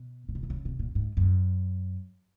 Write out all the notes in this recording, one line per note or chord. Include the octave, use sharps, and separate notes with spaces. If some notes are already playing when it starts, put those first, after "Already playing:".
Already playing: B2
A#2
B2
C3
C#3
C3
A#2
G#2
F#2